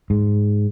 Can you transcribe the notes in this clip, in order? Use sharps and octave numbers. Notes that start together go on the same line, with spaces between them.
G#2